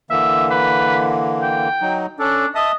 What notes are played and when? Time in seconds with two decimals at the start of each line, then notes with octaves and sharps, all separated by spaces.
0.10 D3 E3 A#3 E5
0.51 B4
1.42 G5
1.81 F#3 D#4
2.19 C#4 D4 A4
2.55 D#5 E5 A5 D#6